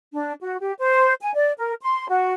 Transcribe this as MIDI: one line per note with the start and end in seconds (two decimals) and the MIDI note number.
0.13 0.33 62
0.41 0.58 66
0.59 0.72 67
0.78 1.14 72
1.21 1.31 80
1.34 1.51 74
1.57 1.74 70
1.82 2.08 84
2.09 2.34 66